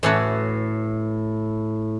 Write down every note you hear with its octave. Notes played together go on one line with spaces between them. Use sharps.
A2 E3 A3 C#4 F#4 B4